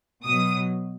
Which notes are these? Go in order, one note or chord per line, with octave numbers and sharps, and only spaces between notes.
B2 F#3 D#6